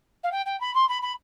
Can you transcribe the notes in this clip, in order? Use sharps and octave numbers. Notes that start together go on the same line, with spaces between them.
F5
G5
G5
B5
C6
B5
B5